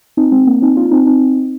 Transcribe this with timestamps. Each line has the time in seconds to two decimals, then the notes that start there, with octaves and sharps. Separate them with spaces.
0.17 C4 D#4
0.32 G#3 C4
0.47 A#3 D4
0.62 C4 D#4
0.77 D4 F4
0.91 C4 D#4
1.06 C4 D#4